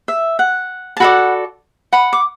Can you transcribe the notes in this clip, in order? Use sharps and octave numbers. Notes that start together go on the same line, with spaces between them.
E5
F#5
A5
F#4 A4 D5 F#5 B5
F#5 B5
D6